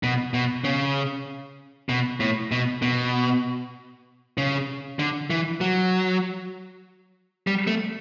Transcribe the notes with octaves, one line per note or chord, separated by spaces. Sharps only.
B2
B2
C#3
B2
A2
B2
B2
C#3
D3
E3
F#3
G3
A3